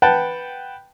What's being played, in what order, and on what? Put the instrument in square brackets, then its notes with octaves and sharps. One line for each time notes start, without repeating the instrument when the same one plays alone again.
[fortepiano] B4 F#5 G5 A5